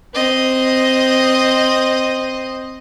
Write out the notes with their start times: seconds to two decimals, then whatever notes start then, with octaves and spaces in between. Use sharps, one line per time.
0.14 C4 D#5